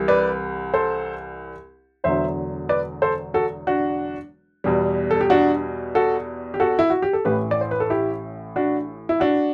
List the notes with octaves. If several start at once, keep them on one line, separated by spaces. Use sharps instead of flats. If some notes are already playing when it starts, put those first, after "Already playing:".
Already playing: C2 C3 E3 G3
B4 D5
A4 C5
E1 E2 D3 F#3 C5 E5
B4 D5
A4 C5
F#4 A4
D4 F#4
E2 B2 G3
A4
G4
D4 F#4
F#4 A4
G4
F#4 A4
E4
F#4
G4
A4
A1 A2 E3 G4 B4
D5
C5
B4
A4
E4 G4
D4 F#4
E4
D4 F#4